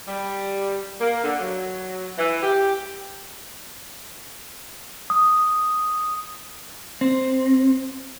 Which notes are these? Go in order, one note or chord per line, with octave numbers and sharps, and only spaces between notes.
G3
A#3
D3
F#3
E3
G4
D#6
C4